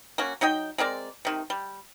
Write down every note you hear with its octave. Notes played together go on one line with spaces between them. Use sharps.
A#3 C#4 F#4
F#3 D#4 D#5 G5
G#3 C4 A#4 D5
C3 D#3
G3